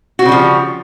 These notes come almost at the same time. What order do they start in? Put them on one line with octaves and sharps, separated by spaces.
F#4 C4 C#3 G3 F3